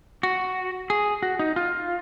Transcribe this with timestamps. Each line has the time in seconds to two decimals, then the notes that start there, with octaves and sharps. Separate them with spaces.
0.23 F#4
0.90 G#4
1.22 F#4
1.39 D#4
1.56 F4